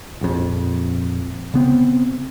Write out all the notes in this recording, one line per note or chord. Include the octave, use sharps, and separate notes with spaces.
A#1 F2
C#3 B3 C4